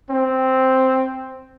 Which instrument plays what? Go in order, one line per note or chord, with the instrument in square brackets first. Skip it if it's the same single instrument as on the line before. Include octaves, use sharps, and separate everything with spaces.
[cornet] C4